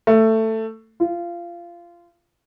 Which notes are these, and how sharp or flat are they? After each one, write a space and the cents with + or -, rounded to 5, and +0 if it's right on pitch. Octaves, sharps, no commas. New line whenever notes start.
A3 +15
F4 -20